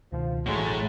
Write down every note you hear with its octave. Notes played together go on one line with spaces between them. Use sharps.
C#2 B2 D#3 F3
A1 A2 E3 F#3 G#3 A3